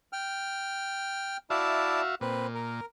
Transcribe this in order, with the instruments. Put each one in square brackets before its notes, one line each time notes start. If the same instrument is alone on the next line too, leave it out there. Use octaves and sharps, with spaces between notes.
[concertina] G5 F6
[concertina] E4 D5 A5 [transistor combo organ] F#4 E5 F5
[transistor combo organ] A#2 [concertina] C4 B4
[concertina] A#4